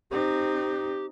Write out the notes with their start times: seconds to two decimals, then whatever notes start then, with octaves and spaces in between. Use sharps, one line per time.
0.11 C4 D#4 G4